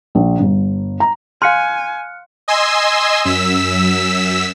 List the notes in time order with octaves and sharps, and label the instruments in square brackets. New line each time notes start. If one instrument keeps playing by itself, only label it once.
[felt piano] A#1
G1
A#5
[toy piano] F5 C6 [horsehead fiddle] G#5 [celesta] F6 F#6 C#7
[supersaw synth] D#5 G#5 C6 E6
F#2 E6 B6